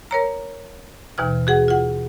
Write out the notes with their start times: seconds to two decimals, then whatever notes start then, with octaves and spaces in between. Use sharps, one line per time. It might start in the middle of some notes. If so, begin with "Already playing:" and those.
0.11 A#4 C#5 A#5
1.18 D#2 B2 E3 F6
1.47 F#4 G#4 F#5
1.68 F4 F#5